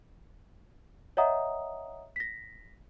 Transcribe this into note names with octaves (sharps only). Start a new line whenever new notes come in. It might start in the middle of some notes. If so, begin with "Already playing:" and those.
C#5 D#5 E5 F#5 A#5 D#6
A#6 B6